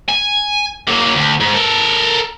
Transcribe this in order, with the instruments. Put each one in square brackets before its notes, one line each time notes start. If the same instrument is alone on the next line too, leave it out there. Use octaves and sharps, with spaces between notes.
[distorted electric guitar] G#5
F#3 A#3
D2
G#2
A4 A#4